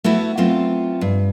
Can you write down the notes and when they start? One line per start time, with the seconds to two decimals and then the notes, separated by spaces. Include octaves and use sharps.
0.04 A3 B3 E4 F#4
0.37 F#3 A3 B3 C4 F4
1.01 G2